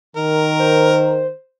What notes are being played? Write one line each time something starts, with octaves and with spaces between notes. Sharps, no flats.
D#3 A#4
C5